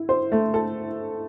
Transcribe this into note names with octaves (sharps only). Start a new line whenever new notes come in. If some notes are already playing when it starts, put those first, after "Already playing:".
Already playing: E4
C5
A3
A4